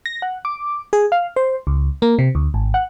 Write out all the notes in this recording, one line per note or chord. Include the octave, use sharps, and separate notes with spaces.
A#6
F#5
D6
G#4
F5
C5
C#2
A#3
C3
D2
G#1
F#5